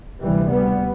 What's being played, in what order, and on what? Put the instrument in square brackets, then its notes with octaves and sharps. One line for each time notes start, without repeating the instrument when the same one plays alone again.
[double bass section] D2 C3 E3 G3
G3 B3